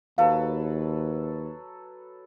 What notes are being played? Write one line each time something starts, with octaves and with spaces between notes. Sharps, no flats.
D#2 F#3 A4 B4 F5